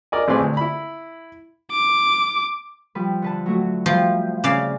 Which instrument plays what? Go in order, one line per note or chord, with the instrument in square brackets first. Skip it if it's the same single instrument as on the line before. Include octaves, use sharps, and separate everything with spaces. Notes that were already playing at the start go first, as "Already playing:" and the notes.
[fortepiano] A#4 D5 D#5 G#5
A1 C4 G#4 B4 D5 C6
D2
E4 B5
[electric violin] D6
[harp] F3 G3 B4
D3 B4 A5
F#3 A3 F#4
[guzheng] F3 [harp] G3 E4 B4
[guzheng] C#3 D5 F5